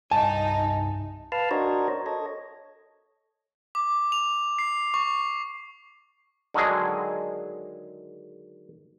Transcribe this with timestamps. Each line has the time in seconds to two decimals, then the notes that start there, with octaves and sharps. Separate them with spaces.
0.11 C2 G2 D#4 G#5 A5
1.32 B4 F5 A5 F6
1.51 D4 F#4 A#4 C5 C#5 D#5
2.06 A4 C#5 D#5
3.75 D6
4.12 F7
4.59 C7
4.94 C#6
6.54 D3 D#3 F#3 G#3 G#4